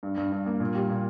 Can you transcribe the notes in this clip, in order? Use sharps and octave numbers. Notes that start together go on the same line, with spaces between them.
G2
G2
G2
A#3
A#2
G3
A#2